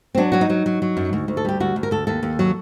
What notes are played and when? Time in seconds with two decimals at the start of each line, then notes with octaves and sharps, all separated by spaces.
0.15 C4
0.17 F#3 D4
0.32 F#3 F#4
0.41 D#4
0.50 F#3
0.66 F#3
0.82 F#3
0.97 F#2
1.13 D2
1.28 D2
1.37 A4
1.45 G3 G4
1.60 D2 F#4
1.76 D2
1.83 A#4
1.91 D2 A4
2.07 D#2 A4
2.23 D#2
2.39 F#3